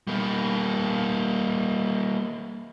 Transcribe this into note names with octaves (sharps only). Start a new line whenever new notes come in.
G3 A#3